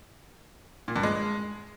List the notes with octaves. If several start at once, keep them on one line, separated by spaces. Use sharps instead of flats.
A#2
G2
G#3